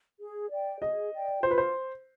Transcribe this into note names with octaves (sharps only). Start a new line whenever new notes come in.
G#4
D5 G5
G#4 D#5
D5 G5
F4 C5
B4
C5